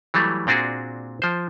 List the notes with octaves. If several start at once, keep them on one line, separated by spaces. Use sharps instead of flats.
E3 F#3 G3 A3
A#2 C4 D4 F#4 G#4
F3 C5